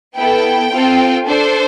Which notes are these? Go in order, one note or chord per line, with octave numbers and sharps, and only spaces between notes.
B3 E4 A4 G5
C4 F4 A4
D4 A4 C5